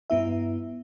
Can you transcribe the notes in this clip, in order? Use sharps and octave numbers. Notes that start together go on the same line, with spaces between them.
G2 B3 E4 E5